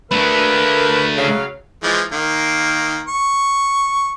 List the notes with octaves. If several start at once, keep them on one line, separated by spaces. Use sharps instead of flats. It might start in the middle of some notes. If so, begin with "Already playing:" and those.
A3 A#3 D4 A#4 B4 E5
C#3 F#3 C#5 F5
E3 F3 G#3
D#3 A#3
C#6